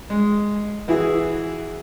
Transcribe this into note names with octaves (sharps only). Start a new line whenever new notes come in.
G#3
E3 E4 F#4 G#4